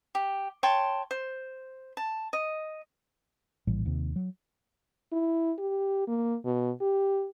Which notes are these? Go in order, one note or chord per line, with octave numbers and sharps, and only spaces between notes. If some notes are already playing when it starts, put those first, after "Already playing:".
G4
C#5 G5 A5 C6
C5
A5
D#5
A#1 A2 E3 G3
D#2 C3
F#3
E4
G4
A#3
B2
G4